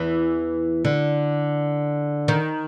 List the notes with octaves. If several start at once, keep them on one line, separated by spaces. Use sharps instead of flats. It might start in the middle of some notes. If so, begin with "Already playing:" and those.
Already playing: E2 E3
D3
D#3